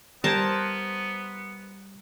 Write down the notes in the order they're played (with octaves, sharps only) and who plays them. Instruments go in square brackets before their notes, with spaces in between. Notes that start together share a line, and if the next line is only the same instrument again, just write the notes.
[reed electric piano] G3 G#6 [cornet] B3 [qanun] A#4 C5 A5